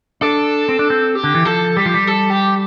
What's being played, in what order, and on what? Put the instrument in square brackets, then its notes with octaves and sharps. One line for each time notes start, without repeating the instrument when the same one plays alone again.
[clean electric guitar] D4 [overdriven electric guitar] A4
[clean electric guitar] C4
D4
C4
[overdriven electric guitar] G4
[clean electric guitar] D3
E3
[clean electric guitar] F3 [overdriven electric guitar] A4
[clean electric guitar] G3 [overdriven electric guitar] G4
[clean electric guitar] F3
G3
[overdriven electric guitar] A4
G4